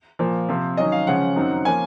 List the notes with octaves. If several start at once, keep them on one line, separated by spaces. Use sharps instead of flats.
A#2 F3 A#3
C3 F3 C4
D#3 F#3 C#4 D#5
F5
C#3 F3 G#3 C#4 F#5
F#2 D#3 F#3 C4 D#4
F3 A#3 C#4 G#5